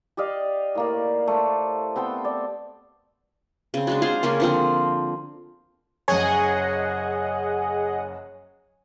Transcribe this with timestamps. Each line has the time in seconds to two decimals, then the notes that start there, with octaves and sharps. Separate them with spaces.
0.17 G4 D5 D#5 F5
0.75 A2 A#3 D5
1.28 A3 C5
1.96 B3 C4 G5 A5
2.25 D5
3.74 C#3 C4
3.87 F#3 G#3 D4
4.02 F4 G#4 C5 F5
4.23 C#3 A#3 C#4
4.40 D3 F3 C4
6.08 F#1 F#2 G#4 C#5 D#5 F#5 G#5